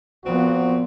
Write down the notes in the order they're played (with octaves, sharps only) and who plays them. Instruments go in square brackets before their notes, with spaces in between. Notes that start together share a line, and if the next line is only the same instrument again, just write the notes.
[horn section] A#2 C4 F#4 [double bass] F3 B3